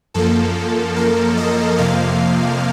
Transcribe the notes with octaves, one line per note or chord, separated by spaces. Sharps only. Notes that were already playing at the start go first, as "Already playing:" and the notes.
F#2 F3 A#3 A4
A#4
D#5
F2 C3 F3 A#3 F5